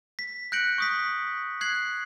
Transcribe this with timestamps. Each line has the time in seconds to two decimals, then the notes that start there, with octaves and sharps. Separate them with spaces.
0.19 B6
0.52 F#6 G6 A#6 C#7 D7 F#7
0.78 C#6 D#6 B6
1.61 F#6 G#6 C7 F#7